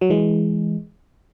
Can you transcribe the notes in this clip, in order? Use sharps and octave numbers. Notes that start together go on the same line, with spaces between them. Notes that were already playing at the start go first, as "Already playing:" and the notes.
F#3
E3 G#3